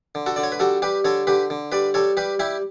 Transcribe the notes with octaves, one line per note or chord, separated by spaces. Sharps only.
D3
F#4 A4
D3 D5
C#5
B4
G3 F#4 A4
G3 G4 B4
D3 A4 C#5
D3 G4 B4
D3
G3 B4 D5
G3 A4 C#5
G3 G4 B4
G3 E4 G4